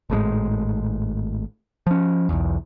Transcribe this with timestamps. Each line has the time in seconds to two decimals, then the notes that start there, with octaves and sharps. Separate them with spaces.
0.10 G#1 A2 C3 G#3
1.87 F3 C#4
2.29 B1 E2